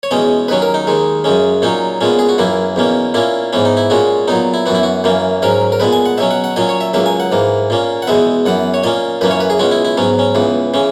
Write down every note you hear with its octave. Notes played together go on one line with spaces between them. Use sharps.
C#5
E2 B2 G#3 C#4 D#5
D#2 D#3 F#3 C#4 B4
A#4
D#4
D#2 D#3 G#3
F#2 C#3 G#3 C#4
A#2 F#3 C#4 D#4
A#2 G#3 B3 C#4
G#4
F#4
F#2 E3 A#3 E4
E2 B2 A#3 C#4
A#2 A#3 C#4 E4
G#2 E3 B3 C#4
D#4
E4
A#2 G#3 C#4 F#4
A#2 F#3 B3 D#4
E4
F#2 E3 B3 F#4
E4
F#4
F#2 E3 A#3 C#4
G#2 F#3 C#4 A#4
A#4
A#2 G#3 B3 B4
G#5
F#5
B2 F#3 C#4 E5
F#5
F#5
A#2 F#3 C#4 D#5
C#5
E5
C#2 C#3 F#3 A#3 E5
G#5
F#5
G#2 E3 A#3
A#2 A#3 C#4
F#5
E2 B2 G#3 B3 E5
F#2 E3 B3 F#5
C#5
A#2 A#3 C#4 D#5
F#2 E3 A#3 C#4 B4
C#5
B4
G#4
C#2 B2 G#3 C#4 F#4
E4
E4
G#2 F#3 B3 C#4
C#4
C#2 C#3 E3 B3
C#3 E3 C#4